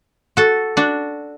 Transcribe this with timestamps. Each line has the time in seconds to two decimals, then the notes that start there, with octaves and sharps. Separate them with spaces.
0.37 F#4 A4
0.77 D4 F#4